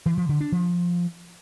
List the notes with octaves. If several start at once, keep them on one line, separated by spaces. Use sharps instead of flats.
E3
F3
D3
D4
F3